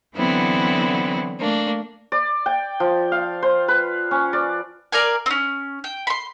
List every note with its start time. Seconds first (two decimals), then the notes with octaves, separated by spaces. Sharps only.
0.15 D3 E3 F#3 B3 C4 E4
1.39 A3 A#3 D4
2.12 D5
2.46 G5
2.80 F3
3.12 F5
3.42 C5
3.68 B4
4.11 C#4
4.33 D5
4.92 A#4 D5 F5 G#5
5.26 C4 C#4
5.84 G5
6.07 B5 C6